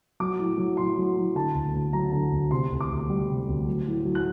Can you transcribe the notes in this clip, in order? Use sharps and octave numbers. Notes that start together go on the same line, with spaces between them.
F#3 D6
A2
F#3
A2 C6
F#3
A2
D3 A5
D2
D2
F#3 A#5
D3
D2
C3 C6
D2
D6
D2
G3
C3
D2
F#3
A2
F#3
F#6